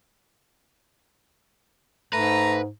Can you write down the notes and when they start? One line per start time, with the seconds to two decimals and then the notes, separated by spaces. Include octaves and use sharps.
2.13 G#2 A3 B4 A#5